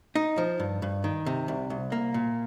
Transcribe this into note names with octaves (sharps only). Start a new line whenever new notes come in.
D#4
F3
G2
G2
D#3
C3
C2
C2
A#3
A#2